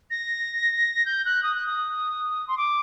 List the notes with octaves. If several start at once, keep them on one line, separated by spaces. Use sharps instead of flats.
A#6
G6
F#6
D#6
F#6
D#6
C6
D6